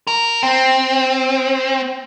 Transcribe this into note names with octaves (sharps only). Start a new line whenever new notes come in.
A#4
C4